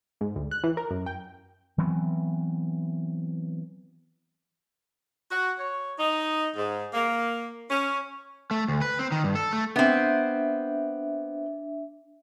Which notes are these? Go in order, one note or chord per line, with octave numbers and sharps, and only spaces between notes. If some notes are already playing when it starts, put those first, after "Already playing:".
G#2
D2
F#6
E3
A#4
F#2
G5
E3 F#3 B3 C4
F#4
C#5
D#4
G#2
A#3
C#4
A3
D2
B4
C4
D#3
G2
A4
A3
B3 C4 D4 E5